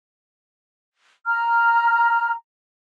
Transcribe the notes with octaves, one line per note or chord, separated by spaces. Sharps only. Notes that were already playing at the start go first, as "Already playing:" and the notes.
A#5 F6